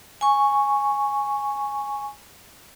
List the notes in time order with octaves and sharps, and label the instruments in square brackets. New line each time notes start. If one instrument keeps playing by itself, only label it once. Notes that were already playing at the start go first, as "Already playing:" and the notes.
[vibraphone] G#5 C#6